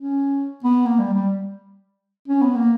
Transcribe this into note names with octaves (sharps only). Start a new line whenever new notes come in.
C#4
B3
A#3
G3
G3
C#4
B3
A#3